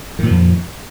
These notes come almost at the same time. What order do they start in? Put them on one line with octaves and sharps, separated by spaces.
D#3 A#2 F3 F2